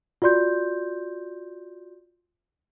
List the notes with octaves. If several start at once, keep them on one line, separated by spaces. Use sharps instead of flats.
F4 F#4 D5 C6 G6